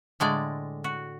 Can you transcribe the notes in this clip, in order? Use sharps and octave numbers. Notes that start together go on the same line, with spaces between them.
A2 D3 G#3 D5
F#4